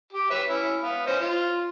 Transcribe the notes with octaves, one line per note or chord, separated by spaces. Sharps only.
G4
B4 C#5 E5
C#4 E4
B3 F5
C#4 C5 D#5
F4